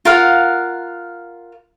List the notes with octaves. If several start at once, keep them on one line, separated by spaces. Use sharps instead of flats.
F4 A#4 F5 F#5